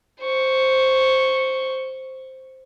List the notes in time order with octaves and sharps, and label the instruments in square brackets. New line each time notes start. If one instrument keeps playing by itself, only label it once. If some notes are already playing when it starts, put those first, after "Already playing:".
[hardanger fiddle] C5 C#6